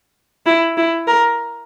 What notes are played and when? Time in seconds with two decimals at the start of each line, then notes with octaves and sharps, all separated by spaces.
0.46 E4
0.77 E4
1.07 A#4